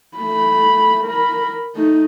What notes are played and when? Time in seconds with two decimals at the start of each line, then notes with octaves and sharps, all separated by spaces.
0.18 A3 B5
1.04 A#4 B5
1.75 A3 D#4